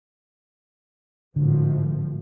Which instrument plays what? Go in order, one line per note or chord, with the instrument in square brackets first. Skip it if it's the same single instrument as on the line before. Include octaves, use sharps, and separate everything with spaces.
[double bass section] G#1 A2 F3 [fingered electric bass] D3